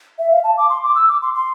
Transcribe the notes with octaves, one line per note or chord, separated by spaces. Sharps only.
E5
F5
A5
D6
C6
D6
E6
D6
C6
C6